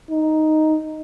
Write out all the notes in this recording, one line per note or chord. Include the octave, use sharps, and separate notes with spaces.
D#4